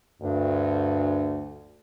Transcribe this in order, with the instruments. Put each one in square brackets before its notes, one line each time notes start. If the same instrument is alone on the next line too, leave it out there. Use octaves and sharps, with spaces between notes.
[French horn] D2 [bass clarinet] G2